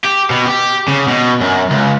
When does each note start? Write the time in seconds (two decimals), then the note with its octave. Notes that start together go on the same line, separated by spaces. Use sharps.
0.04 G4
0.30 B2
0.46 G4
0.88 C#3
1.08 B2
1.41 F#2
1.71 C#2